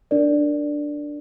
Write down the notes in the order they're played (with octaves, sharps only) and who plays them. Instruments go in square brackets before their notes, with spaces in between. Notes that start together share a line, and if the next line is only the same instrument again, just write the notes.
[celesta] D4 A#4 D5